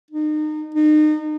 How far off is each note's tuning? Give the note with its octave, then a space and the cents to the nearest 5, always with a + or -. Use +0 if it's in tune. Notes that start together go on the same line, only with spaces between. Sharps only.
D#4 -30
D#4 -35